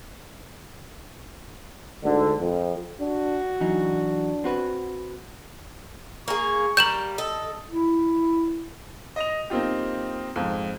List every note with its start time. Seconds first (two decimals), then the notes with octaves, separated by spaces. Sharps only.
2.04 D2 G#2 D3
2.40 F2
3.00 D4 F#4
3.61 E3 F#3 D4 D#4
4.44 C4 F#4 B4
6.28 A#3 G#4 C#6
6.77 G3 A#3 G6 E7 F#7
7.18 A4 D#5
7.71 E4
9.16 D#5 A#6 F7
9.50 A#3 C4 D#4 F4 G4
10.36 F2 G#2